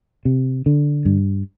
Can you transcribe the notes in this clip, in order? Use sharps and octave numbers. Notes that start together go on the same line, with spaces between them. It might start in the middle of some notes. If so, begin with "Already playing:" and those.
C3
D3
G2